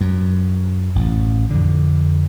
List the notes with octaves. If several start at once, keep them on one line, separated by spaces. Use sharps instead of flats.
F#2
A1
F2 D3